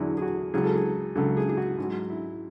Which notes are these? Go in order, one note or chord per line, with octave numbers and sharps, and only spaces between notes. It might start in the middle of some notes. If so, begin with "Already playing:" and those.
Already playing: E2 D3 F#3 D4 E4 F#4 G#4
G#4
F#4
C#2 C#3 F#3 G#4
A4
G#4
C#2 C#3 F#3 A4
G#4
G#4
F#4
G#2 F#3
E4